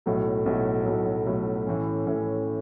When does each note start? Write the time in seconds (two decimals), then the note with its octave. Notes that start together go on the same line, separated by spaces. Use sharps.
0.06 B1 A2 F#3 A3
0.46 B1 A2 F#3 A3
0.86 B1 A2 F#3 A3
1.26 B1 A2 F#3 A3
1.66 A2 E3 A3 C#4
2.06 A2 E3 A3 C#4